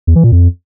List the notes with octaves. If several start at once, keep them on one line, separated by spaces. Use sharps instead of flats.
E2
E3
A#2
F2